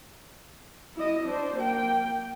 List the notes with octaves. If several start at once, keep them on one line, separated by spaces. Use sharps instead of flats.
E4 D#5
D4 C5
A#3 G5